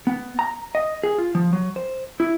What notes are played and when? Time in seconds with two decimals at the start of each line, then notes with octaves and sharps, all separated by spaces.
0.07 B3
0.39 A#5
0.75 D#5
1.03 G#4
1.18 F4
1.35 F3
1.53 F#3
1.76 C5
2.20 E4